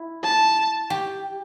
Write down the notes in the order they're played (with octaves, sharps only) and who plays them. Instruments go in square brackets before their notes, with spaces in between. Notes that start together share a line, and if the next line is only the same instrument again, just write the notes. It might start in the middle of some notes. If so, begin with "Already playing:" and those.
Already playing: [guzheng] E4
[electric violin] A5
[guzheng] G4